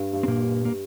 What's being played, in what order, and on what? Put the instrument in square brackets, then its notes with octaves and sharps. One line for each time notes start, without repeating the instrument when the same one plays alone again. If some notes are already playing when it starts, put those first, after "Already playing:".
Already playing: [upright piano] G2
G2
[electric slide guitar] C4
A#2 A#3
[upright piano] G2
[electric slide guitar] A#3